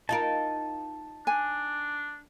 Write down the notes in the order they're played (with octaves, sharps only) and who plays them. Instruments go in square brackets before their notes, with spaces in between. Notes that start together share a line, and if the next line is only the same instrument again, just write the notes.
[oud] D#4 F4 A#4 [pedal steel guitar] A5
[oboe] D4 [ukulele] G#5